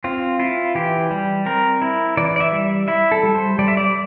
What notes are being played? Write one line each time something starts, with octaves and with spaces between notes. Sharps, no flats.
C4 F4
E4 F4
E3 G4
G3
C4 A#4
E4
E3 D5
D5
E5
G3
E4 E5
A4
G3
C5
G3 D5
E5
D5